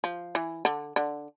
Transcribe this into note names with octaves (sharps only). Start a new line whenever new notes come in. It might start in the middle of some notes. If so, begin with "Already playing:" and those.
F3
E3
D3
D3